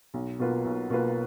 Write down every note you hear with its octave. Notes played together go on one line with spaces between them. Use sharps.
B1
B2 A#3 F4 B4
B1
B2 A#3 F4 B4